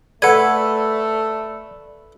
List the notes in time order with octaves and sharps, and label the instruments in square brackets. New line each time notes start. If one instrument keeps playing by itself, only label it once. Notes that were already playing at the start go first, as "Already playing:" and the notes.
[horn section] A3 [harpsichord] A4 B4 [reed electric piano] D5 B5 E6 [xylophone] F#5 G#6